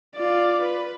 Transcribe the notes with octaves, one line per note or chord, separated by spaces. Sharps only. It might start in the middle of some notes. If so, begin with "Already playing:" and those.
F4 D5
B4